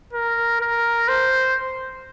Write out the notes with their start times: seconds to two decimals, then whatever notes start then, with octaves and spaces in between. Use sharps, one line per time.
0.13 A#4
0.60 A#4
1.08 C5